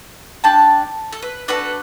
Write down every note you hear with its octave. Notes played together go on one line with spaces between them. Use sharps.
D4 G4 A5
A4
B4
D4 F#4 A4 B4